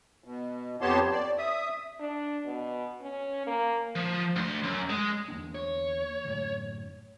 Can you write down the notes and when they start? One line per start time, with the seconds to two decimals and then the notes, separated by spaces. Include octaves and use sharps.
0.24 B2
0.81 F2 B3 G4 C#5 A5 C6
1.11 D5
1.38 E5 D#6
2.00 D4
2.46 B2
3.02 C#4
3.47 A#3
3.96 F3
4.36 D2 C6
4.64 F#2
4.90 G#3
5.28 E2 A#3 D4
5.55 C#5
6.25 F#2 A2 D3